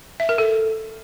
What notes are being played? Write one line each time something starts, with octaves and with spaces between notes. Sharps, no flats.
E5
A#4
A4